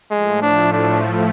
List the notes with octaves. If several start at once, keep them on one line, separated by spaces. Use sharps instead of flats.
A2 F3 G#3 A3
D4
D4